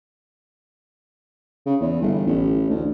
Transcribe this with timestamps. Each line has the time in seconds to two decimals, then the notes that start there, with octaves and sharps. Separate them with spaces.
1.66 C#3
1.81 E2
2.02 G1
2.27 A1
2.70 D2